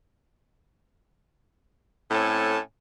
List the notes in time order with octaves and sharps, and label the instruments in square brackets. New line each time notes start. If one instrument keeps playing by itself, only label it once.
[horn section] A2 C4 C#4 A4 A5